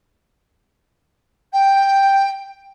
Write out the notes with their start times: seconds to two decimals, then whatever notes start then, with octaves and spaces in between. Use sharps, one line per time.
1.52 G5